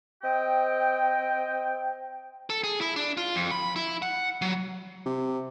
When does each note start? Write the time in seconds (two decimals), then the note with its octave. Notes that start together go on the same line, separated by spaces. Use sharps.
0.22 C4 D#5 G5
2.50 A4
2.64 G#4
2.81 E4
2.96 D4
3.17 F4
3.35 F2
3.51 B5
3.76 E4
4.02 F#5
4.42 F#3
5.06 C3